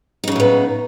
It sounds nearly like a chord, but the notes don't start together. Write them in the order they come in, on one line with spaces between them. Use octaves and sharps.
D#4 C#3 F#3 A2 B3